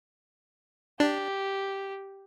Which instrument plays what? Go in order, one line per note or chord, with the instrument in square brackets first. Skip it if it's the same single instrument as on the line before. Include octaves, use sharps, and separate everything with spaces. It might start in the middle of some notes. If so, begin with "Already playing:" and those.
[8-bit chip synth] D4 [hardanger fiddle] G4